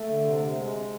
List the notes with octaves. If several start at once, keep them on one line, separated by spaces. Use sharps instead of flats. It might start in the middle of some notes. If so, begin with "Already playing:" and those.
Already playing: A3
D3
C3
C3
G#3